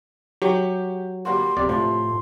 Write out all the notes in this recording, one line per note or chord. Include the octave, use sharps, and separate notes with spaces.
F#3 G4 C#6
G3 A#3 F#4 C6
D1 C3 D5
A2 F3 C6